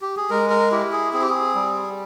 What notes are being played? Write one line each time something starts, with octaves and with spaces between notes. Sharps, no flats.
G4
G#4
G#3 A#4
A#4
E4 G4
G#4
C4 G#4
G4
G#4
G3